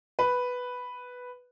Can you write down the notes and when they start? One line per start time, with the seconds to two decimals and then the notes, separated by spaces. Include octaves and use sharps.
0.19 B4